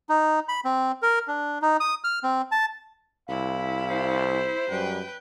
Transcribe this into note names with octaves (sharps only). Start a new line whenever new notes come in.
D#4
B5
C4
A#4
D4
D#4
D#6
F6
C4
A5
C2 E4 F5 B5
C5
F#2 G3 B4 G5